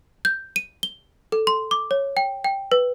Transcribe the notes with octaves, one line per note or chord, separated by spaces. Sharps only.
G6
D#7
G7
A4
C6
D6
C#5
G5
G5
B4